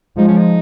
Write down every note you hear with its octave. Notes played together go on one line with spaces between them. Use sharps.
F3 G#3 D#4
C#4
D#4